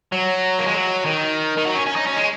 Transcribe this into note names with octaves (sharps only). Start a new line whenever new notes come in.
F#3
A#3
G#3
F#3
D#3
D#3
F#3
C#4
C#4
D#4
C#4
G#3